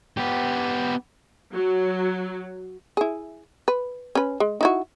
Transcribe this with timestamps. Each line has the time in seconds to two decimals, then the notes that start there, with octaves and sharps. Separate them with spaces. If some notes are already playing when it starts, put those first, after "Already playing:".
0.17 B3 G4
1.53 F#3
2.97 E4 G#4
3.68 B4
4.15 C#4 B4
4.40 G#3
4.61 D#4 E4 F#4